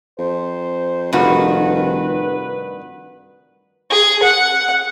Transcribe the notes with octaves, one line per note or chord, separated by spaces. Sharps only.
F2 C5
F1 G2 D#3 F#4 B4
G#4
F#5